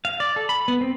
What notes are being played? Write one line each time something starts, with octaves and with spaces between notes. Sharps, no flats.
F5
D5
A4
B5
B3
C4